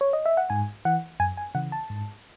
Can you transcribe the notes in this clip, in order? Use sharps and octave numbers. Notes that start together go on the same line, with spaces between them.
C#5
D#5
E5
F#5
G#2 G#5
E3 F#5
F#2 G#5
G#5
C#3 E3 F#5
A5
G#2